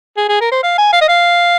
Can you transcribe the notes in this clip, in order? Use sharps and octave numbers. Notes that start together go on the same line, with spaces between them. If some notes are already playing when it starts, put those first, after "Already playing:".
G#4
G#4
A#4
C5
F5
G#5
F5
D#5
F5